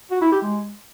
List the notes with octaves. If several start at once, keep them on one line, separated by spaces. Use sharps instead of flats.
F#4
E4
G4
G#3